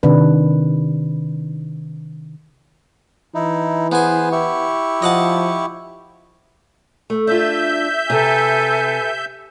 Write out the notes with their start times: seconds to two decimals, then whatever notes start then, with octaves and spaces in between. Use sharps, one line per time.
0.03 C3 D#3 D4 B4
3.35 E3 D#4 E4
3.92 B3 G#4 B4 C5 G#5
4.32 E4 G4 C#6
5.02 F3 D#5 F#5 A5
7.10 A3
7.27 D4 F4 E5 G6
8.10 C3 A4 B4 G#5